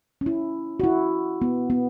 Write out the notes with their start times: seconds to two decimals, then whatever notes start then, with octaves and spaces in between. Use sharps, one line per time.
0.21 C#4
0.26 E4
0.80 F#4
0.84 E4
1.42 B3
1.70 B3